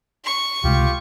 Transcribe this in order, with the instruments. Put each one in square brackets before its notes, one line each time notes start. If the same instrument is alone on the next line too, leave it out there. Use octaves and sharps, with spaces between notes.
[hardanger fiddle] C#6
[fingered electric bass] C#2 C3 G#3 [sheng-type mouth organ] F4 G4